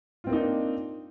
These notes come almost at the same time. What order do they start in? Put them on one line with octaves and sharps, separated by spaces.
F4 C4 A#3 D#4 D4